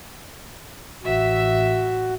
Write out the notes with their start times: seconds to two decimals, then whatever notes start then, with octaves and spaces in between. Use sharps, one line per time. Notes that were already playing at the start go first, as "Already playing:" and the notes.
1.04 A1 F#4 E5